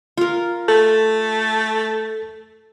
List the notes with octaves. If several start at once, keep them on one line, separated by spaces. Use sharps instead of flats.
F4 A#4
A3 A4